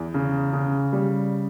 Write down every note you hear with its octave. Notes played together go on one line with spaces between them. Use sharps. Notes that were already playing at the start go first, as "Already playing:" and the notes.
Already playing: E2
C#3
C#3
G3